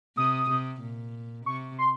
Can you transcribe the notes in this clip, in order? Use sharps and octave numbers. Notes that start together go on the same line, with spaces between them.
C3 D#6
C3
A#2
C3 C#6
C6